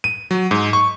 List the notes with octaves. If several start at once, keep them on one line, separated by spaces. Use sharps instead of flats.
D#7
F#3
G#2
C#6